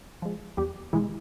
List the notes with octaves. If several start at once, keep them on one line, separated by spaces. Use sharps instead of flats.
F3 G#3
E2 G3 G4
B2 E3 G#3 E4